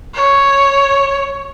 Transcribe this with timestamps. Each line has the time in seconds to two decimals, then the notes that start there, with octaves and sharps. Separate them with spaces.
0.15 C#5